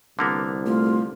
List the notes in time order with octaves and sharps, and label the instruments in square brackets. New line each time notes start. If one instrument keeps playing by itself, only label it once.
[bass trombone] C2 [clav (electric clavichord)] D3 A#3 B3
[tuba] A3 [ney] F4